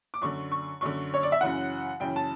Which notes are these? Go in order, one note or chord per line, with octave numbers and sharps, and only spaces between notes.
D6
F#2 D3 C#6
C#6
F#2 D3 C#6
C#5
D5
E5
F#2 C#3 E3 F#5
F#2 C#3 E3 G5
A5